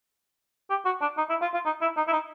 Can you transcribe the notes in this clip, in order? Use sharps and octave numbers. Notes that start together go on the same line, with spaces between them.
G4
F#4
D4
D#4
E4
F4
F4
D#4
E4
D#4
E4
D#4